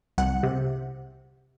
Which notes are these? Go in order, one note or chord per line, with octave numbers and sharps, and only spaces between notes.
C2 F#5
C3